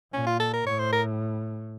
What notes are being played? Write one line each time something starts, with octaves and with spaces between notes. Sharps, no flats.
A#2 C#4
F4
A4
A#4
A2 C#5
C5
A#4